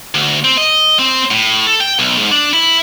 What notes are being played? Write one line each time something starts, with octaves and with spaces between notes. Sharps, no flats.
D2
C4
D#5
C4
A2
A4
G5
B1
G#2
D4
E4